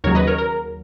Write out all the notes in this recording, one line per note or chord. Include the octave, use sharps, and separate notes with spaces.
D#2 C#3 F#3 A#4 C#5
B4 D#5
A#4 C#5
A#4